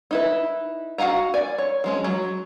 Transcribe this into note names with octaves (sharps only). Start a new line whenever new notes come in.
D#4 E4 B4
F#4 F5 F#5 G#5 A#5
D5 G#5
C#5
F3 G#3 C#4
F#3